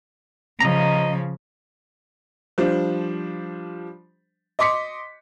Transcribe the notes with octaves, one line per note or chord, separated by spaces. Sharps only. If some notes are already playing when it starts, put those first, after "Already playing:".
C#3 F3 D#5 A#5
F3 G3 D4 C5
D#5 C6 D6 B6 C#7